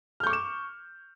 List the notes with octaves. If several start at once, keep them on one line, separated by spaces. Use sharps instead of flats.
C#6 D6 F6 G6 E7